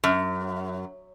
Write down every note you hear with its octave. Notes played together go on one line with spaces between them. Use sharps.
F#2